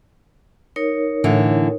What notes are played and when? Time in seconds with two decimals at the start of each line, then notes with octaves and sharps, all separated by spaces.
0.76 D#4 A#4 C#5
1.24 A2 D3 E3